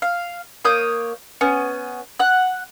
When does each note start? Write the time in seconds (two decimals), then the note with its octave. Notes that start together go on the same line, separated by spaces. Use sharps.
0.02 F5
0.65 A#3 C#5 D#6 G6
1.41 B3 C#4
2.20 F#5 F#6